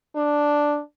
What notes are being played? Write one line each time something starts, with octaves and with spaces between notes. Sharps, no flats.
D4